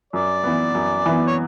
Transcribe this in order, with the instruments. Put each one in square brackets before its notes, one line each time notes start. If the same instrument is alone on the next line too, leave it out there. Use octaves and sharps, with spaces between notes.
[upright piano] F#2 [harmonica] D5
[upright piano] E3 B3
F#2
E3 B3
[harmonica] C#5